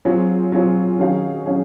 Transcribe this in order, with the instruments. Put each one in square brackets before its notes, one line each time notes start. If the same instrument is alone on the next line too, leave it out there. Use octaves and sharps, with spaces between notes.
[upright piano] F#3 [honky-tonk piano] C4 F4 G#4 C#5
[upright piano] F#3 [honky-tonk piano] C4 F4 G#4 C#5
[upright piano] D#3 [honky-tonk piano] F#3 C#4 G#4 C#5 F5
[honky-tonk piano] F#3 C#4 G#4 C#5 F5